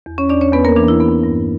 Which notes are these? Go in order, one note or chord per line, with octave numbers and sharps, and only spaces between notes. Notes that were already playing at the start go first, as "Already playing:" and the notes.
E2
C#4 C#5
E2 D4 D5
C#4 C#5
E2 B3 B4
A#3 A#4
E3 D4
E4
B3
G2